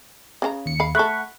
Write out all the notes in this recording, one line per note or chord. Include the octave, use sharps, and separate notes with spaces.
C#3 C#4 A#5
D#2 C#7
F5 B5
A3 A4 F#5 B5 C#6